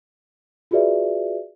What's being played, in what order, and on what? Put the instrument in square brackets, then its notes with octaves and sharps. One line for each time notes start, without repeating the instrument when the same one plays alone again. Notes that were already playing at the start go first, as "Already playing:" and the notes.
[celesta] F4 F#4 G#4 B4 D5 E5